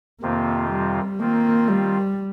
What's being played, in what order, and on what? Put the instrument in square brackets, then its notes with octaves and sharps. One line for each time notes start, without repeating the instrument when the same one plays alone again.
[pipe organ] F2 C3 D#3 C4 F4 [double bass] A#3
[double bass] G3
[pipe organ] D#3 C4 F4 [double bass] A#3
[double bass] G3